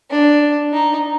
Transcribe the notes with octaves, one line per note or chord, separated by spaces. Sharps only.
D4
D#4